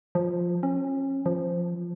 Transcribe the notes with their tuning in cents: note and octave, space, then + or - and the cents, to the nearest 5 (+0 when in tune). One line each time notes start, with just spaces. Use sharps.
F3 +10
C#4 -35
F3 -5